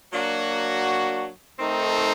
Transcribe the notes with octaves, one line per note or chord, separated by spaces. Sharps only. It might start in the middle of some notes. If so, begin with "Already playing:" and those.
F#3 A#3 D4 F#4
D#3 A3 C4 D#4 A4